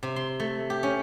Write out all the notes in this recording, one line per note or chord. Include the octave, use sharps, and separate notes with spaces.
C3
C6
A3
G4
C#4